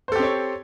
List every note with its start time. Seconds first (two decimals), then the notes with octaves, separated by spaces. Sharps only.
0.08 C5
0.12 A4
0.16 G4
0.19 C4
0.23 C#5